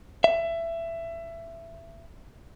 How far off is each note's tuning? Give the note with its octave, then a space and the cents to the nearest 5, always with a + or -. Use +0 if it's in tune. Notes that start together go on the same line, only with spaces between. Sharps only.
E5 +20